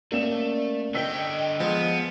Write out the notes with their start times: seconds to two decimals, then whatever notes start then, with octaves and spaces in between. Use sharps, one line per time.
0.12 A3 A#3 C#4 D5 E7
0.95 D3 D#5 G5 E6 B6
1.60 F3 G#3 B3